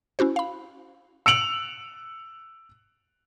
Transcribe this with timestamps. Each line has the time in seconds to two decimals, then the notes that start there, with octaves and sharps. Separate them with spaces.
0.19 C#4 E4 F#4 C5
0.36 F5 B5
1.26 E6 C#7 D7 F7 F#7